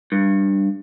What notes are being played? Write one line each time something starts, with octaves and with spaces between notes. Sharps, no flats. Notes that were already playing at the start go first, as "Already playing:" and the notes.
G2